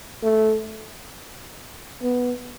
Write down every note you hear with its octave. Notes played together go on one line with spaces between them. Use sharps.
A3
B3